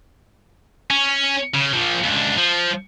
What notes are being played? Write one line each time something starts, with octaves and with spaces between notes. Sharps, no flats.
C#4
C#3
A#2 F3
C#2 D3
F3